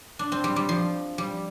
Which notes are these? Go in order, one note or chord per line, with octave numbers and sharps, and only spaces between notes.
D4
C4
G3
G3
F3
G3